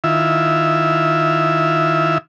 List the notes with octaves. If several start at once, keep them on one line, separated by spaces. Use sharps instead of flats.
D#3 E4 F4 E5